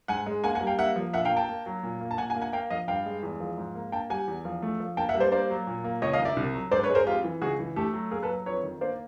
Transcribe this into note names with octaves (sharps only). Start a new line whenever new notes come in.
G#2 F#5 G#5
G#3
A#3 F#5 G#5
F#5 G#5
G3
F5 G5
A#3 E5 F#5
F3
A#2 E5 F#5
F5 G5
A#3
G5 A5
A#3
F#3
A#2
A#3
A5
A#2 F#5 G#5
F#5 G#5
A#3
F#5 G#5
A#3 F5 G5
F3 D#5 F5
G2 F5 G5
G#3
E2
F3
G#2
A#3
A#3 G5 A5
G3 F#5 G#5
E2
F3
A3
F3
A#3 G5 A5
E5 F#5
G3
C5 D5
A#3 C5 D5
F#3
A#2
A#3
C#2 C#5 D#5
D#5 F5
D#3
D5 E5
C2
F#3
G#2 C5 D5
B4 C#5
G#3
A#4 C5
F2 F4 G4
E3
C#2 F#4 G#4
E3
A3 G4 A4
F#3
A#3 G#4 A#4
A4 B4
F#3
F2 B4 C#5
D#3
A#3 C5 D5